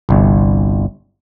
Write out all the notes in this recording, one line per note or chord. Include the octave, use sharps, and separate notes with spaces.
G1 C2